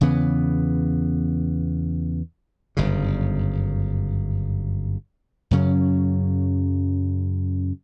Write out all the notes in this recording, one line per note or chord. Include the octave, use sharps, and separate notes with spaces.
E2 C#3 E3 B3
G1 F#2 C#3
F#2 C#3 F#3 C#4